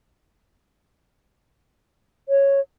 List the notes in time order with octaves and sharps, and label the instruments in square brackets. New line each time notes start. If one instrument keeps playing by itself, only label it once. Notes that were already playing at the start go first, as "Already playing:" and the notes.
[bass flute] C#5